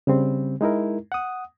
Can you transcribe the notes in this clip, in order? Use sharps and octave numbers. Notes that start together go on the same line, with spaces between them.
C#3 G3 C4
G#3 D#4 E4 A#4
F#5 D#6